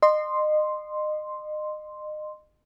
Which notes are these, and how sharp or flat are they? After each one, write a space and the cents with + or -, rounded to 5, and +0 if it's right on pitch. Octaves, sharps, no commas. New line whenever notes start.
D#5 -30 C6 +0